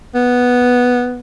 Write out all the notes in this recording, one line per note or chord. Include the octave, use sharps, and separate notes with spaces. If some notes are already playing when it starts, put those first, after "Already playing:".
B3